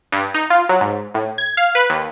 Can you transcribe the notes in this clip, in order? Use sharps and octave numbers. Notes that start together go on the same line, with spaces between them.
G2
D#4
F4
F#3
G#2
A2
G#6
F5
B4
D#2